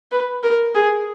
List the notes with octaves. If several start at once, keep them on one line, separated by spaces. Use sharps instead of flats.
B4
A#4
G#4